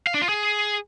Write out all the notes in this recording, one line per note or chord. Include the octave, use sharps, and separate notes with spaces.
F5
D4
F4
G#4